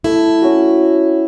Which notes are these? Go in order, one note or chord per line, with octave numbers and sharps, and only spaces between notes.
A3 E4
C#4 F#4